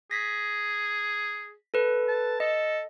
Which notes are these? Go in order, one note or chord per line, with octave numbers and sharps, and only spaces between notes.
G#4 A#6 B6
A4 B4
A5
A4 D#5